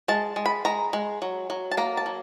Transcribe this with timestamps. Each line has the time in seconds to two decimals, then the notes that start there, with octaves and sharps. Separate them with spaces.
0.08 G#3 A5
0.36 G#3
0.46 B5
0.65 G#3 A#5
0.93 G#3
1.22 F#3
1.50 F#3
1.71 A5
1.77 A#3 A#5
1.97 A5
2.06 F#3